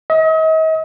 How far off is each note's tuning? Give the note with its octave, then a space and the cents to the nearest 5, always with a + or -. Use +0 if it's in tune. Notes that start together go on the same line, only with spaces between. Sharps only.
D#5 +40